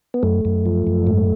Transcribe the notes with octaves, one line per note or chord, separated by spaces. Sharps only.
B3
F#2 A3
F#2
F3
F#2
G#2